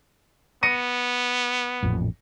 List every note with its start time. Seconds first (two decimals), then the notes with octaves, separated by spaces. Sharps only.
0.63 B3 A#6 C#7 D#7
1.83 A1 F2 A#2